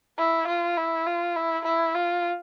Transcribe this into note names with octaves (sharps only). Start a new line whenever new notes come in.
E4
F4
E4
F4
E4
E4
F4